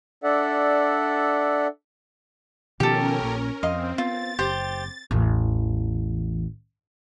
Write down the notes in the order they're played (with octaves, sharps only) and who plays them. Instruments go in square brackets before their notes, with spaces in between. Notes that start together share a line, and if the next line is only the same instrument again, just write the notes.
[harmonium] D4 A4 D5 E5 F#5
[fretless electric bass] B2 D#3 F3 [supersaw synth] C#4 A#4 [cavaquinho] G4 A4
[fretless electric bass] A#1 A#2
[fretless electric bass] F2 [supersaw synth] C4 [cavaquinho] D#5 F5 C6
[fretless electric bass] B3 [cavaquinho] F4 [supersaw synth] A6
[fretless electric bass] F#1 [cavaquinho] G4 C5
[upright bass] A1 E2